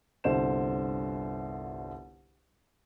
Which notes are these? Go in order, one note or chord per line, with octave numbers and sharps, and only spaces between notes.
G1 C2 D3 C5 E7